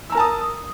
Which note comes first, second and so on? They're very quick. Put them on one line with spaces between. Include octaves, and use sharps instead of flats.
E6 A#5 A#4 A5 D#6